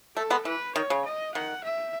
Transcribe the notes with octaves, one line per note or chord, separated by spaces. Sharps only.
A3 A4
G#3 B3
E3 B4
D#3 C#5
C#3
D#5
D#3 F#5
E5